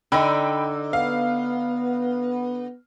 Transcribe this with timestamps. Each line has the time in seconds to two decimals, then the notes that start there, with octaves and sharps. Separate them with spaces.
0.12 D3 D#4 G5 B5 E6
0.93 B3 F5